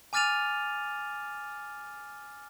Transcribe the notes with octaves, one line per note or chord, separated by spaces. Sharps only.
G#5 D6 F6 A6 D#7 F7